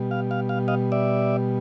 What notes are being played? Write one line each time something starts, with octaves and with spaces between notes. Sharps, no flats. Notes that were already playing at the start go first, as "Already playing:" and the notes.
Already playing: B2 G3
F5
F5
F5
D#5 F5
D5 E5